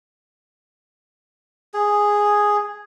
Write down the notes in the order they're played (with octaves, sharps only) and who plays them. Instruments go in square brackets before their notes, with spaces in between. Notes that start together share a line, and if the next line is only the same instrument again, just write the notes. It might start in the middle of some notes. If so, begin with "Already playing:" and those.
[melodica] G#4